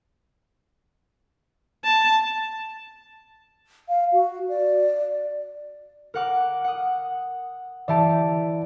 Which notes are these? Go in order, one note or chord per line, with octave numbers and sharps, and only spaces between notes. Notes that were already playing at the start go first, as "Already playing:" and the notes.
A5
F5
F#4
D5
A#4 F#5 D6
F#5 D#6
E3 G4 D5 E5 A5 D7